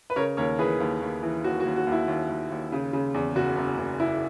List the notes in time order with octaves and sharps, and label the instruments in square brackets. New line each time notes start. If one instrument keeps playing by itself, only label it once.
[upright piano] B4
C#3 A#4 C#5
D#2 A#4 C#5
E3 G#4 B4
D#2
D#2
E3
D#2 F#4
F#4
D#2
F#4
D#2
E4
D#2
D#2
D#2
C#3
C#3
E2
F#1 F#4
F#1
F#1
F#1 E4